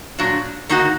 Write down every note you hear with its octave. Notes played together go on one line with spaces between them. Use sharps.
A#2 F#3 D4
D#3 A#3 D#4 F#4